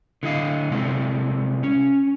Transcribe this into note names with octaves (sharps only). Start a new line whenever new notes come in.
D3 E4 D#5 F5
C3 G#3 C4 E4 A4
C#4